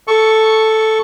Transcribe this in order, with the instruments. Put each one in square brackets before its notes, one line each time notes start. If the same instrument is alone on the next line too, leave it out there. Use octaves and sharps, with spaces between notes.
[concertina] A4 C#6